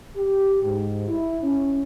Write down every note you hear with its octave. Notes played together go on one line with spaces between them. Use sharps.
G4
G#2
E4
C#4